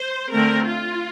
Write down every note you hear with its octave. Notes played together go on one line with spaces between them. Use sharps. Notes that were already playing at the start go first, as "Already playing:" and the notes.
Already playing: C5
D3 A3 C4 A#4
F4